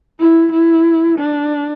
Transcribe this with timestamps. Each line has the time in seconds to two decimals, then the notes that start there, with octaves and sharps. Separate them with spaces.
0.20 E4
0.53 E4
1.19 D4